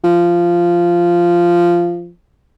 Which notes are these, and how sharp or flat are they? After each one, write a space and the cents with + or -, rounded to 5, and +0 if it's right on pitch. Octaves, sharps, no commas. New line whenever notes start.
F3 -10